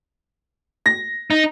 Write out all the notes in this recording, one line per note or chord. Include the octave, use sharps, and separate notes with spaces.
A#6
D#4